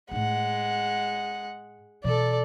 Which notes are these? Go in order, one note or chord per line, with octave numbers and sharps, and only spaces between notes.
A2 G#3 D#4 F#5
B2 E3 A4 D5